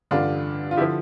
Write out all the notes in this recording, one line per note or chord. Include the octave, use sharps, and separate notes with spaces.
A1 G2 D3 D4 F4
F4
E4 G4
D3 F3